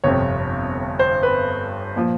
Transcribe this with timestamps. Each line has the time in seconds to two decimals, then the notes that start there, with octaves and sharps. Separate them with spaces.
0.04 G1 F2 C3 C#5
0.99 C5
1.23 B4
1.96 A#2 F3